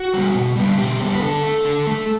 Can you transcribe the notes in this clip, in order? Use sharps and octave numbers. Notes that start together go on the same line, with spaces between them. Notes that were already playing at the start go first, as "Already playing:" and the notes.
Already playing: F#4
G3 B3
B2
G3 B3
B2 G4
G3 B3
B4
D3 A4
A3
D3
A3